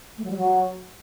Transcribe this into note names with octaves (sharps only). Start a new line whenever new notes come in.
A3
F#3
G3
F#3